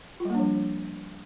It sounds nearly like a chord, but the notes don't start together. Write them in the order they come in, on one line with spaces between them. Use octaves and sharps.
F4 G3 A#3 D4 F3